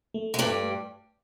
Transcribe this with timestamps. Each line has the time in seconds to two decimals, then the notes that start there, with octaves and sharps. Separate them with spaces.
0.14 A3
0.34 G#3
0.39 G2 G3 A3